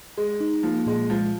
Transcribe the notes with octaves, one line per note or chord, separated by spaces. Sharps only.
G#3 G#4
D#4
F3 A#3
A#2 G#3
F3 G#3